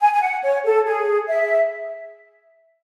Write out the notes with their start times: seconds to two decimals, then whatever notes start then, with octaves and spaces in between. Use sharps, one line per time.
0.01 G#5
0.13 G#5
0.22 F#5
0.43 C#5
0.65 A4
0.86 G#4
1.29 E5